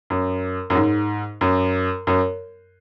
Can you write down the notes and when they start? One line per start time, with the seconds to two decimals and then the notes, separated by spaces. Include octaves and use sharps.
0.10 F#2
0.70 F#2
0.75 G#2
1.41 F#2
2.07 F#2